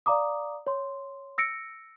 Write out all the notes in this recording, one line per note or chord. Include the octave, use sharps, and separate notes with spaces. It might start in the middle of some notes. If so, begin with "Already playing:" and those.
D5 F5 A#5 D6 D#6
C#5 C6
E6 A#6 C#7 D7